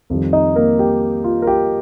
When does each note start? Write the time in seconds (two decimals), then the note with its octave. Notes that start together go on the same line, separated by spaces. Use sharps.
0.10 F2 D#3 G3
0.33 D#4 D#5
0.56 A#3 A#4
0.79 G4
1.24 F4
1.42 A#4
1.47 G4